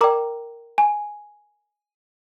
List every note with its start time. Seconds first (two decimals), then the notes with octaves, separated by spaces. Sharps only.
0.01 A#4 D5 G5 A#5 D6
0.78 G#5